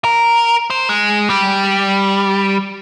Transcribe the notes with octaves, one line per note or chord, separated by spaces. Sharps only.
A#4
C5
G#3
G3